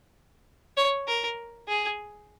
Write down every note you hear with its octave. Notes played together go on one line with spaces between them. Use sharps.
C#5
A#4
G#4